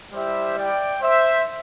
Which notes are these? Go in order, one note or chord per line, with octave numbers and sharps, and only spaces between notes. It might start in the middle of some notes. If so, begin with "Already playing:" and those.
G3 E4 G4 C5 E5
D5 G5
C5 E5